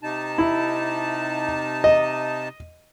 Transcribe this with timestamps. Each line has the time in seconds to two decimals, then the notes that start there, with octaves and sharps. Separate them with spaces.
0.03 C3 D#4 A5
0.38 E4
1.84 D#5